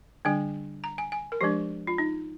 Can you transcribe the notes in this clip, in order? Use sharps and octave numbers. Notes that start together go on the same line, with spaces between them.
D3 G3 D4 G#5
A#5
G#5
G#5
A#4
F3 G#3 D4 G4
F4
D#4